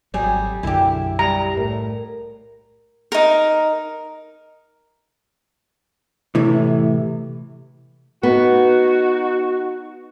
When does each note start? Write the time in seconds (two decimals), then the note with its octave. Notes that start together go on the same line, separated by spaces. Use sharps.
0.14 G#1 F#3 G3 G#4
0.63 B1 F#2 D3 E4 G4
1.19 G3 A#5
1.57 A2 A#4
3.12 D#4 A#4
6.35 A2 C3 E3
8.23 B3 D#4 F#4